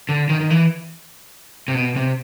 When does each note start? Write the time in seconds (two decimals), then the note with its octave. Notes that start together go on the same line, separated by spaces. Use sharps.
0.09 D3
0.29 D#3
0.40 D#3
0.50 E3
1.68 C3
1.75 B2
1.96 C3